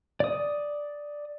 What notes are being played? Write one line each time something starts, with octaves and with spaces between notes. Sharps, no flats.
D5 D#6